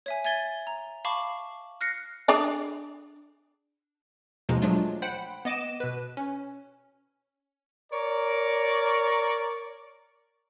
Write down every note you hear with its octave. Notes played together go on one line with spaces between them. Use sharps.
C#5 E5 G#5
E5 G#5 G#6 A6 G7
A#5
F5 A5 B5 C#6 D6
F6 F#6 A#6 C7 C#7
D4 G#4 D5
D#2 B2 F3 G#3 D#4
F3 F#3 G#3 A3 D4 F4
C5 F#5 G5 B5
B3 D#5 D6 D#7 E7
B2 B4
C#4
A#4 C#5 D5